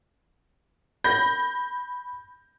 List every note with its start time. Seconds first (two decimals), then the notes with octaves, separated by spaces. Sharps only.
1.04 B5 G6 A#6